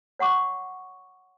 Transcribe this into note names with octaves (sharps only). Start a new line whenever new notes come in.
C#5 F#5 C#6 D6